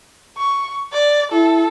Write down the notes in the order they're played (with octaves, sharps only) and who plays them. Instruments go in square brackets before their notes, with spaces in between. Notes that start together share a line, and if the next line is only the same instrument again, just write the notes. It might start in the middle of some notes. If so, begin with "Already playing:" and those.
[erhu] C#6
D5
[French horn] E4 [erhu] A4